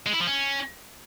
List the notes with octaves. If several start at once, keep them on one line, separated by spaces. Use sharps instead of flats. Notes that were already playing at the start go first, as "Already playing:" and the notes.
G#3
E4
F3
C#4